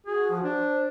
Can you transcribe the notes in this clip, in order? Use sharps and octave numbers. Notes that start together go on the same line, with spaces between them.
F#4 G#4
F3
D4 C5